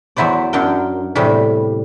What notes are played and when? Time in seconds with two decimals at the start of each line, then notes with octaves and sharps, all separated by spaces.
0.17 E2 F#3 E4 C5 D5
0.53 F#2 F#3 D4 A#4 G5
1.15 E2 A2 C3 G3